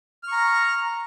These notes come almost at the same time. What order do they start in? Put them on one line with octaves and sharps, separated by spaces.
F6 C#6 A#5